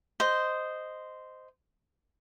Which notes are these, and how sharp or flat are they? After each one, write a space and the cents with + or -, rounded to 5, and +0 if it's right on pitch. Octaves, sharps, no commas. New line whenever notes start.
C5 -10 D#5 -5